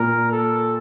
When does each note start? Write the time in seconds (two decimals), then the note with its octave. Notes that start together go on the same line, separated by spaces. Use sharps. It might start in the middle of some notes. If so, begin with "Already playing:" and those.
Already playing: A#2 A#4
0.31 A4